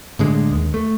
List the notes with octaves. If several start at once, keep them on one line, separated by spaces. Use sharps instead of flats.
A2 D3 G#3
D#2
A3